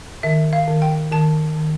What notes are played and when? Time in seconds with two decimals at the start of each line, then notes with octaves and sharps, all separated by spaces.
0.23 D#3 E5
0.53 F5
0.68 D#3
0.82 G5
1.11 D#3 A5
1.56 D#3